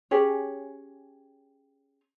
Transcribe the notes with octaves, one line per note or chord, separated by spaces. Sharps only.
C#4 G4 G#4 C#5